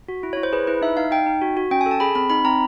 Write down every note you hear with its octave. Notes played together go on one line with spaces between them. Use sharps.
F#4
E4
C#5
E4
C5
G#4 B4
E4 B4
D#4 E5
D#4 F5
D#4 G5
D#4
F#4
F#4
C#4 G5
G#5
A4
A5
G#4 B5
C4 B5
D#4 B5
C4 A#5